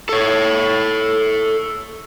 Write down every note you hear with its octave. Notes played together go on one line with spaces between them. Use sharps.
A4 C#5